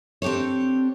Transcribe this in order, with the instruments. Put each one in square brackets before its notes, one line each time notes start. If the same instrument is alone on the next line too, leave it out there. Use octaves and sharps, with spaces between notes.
[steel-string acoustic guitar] C4 D4 G4 A4 C#5